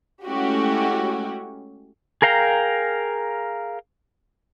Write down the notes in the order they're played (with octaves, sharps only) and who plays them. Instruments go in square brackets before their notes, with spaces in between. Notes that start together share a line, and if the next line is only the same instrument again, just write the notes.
[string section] G#3 A3 C#4 E4 F#4 G4
[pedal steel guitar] G#4 A#4 F5 G5 A#5